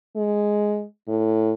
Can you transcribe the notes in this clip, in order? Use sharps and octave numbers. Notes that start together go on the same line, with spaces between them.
G#3
A2